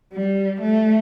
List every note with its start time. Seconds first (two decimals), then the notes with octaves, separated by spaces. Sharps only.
0.13 G3
0.61 A3